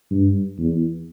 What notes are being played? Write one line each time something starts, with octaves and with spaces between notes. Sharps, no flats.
G2
E2